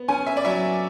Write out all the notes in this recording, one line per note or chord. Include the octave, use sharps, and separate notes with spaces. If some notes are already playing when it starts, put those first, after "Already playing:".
Already playing: B3
C#4 G#5
E5
D5
F#3 E5